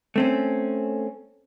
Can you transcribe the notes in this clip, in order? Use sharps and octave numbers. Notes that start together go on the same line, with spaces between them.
A3 C4 C#4